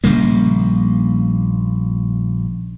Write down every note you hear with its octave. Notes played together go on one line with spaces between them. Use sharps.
A#1 C#3 G3 A#3